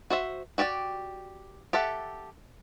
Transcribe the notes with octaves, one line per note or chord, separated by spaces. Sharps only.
F#4 C5 E5
F#4 G4 D5 G5
G4 A4 E5 F#5